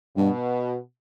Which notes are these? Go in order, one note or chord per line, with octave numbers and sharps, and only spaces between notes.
G2 B2